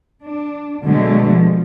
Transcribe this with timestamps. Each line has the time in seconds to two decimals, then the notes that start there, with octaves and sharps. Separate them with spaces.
0.24 D4
0.83 B2 D3 F#3 G#3 A3
1.29 F3